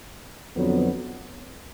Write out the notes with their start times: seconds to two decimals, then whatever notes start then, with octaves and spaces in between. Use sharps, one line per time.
0.56 F2 D3 F#3 B3